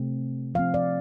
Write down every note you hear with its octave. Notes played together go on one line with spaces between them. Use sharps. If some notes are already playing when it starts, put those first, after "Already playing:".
Already playing: C3 A3 C4
F3 C4 F5
D5